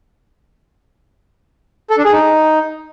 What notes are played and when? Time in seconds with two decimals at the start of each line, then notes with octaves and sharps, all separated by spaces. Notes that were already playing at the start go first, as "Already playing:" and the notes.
1.90 A4
1.98 D4
2.05 G#4
2.12 D#4